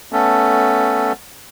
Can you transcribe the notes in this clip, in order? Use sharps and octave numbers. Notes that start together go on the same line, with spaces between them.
A3 B3 C#4 A4